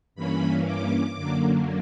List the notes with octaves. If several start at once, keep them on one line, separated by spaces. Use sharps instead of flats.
G2 E3 A#3 C#4 B5
D6
F#2 D3 F#3 A#3